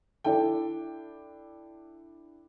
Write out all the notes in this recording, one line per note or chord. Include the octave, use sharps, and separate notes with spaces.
D4 E4 A4 G5